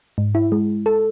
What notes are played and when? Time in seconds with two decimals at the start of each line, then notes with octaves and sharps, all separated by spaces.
0.18 G#2
0.35 E4
0.52 G#3
0.86 A4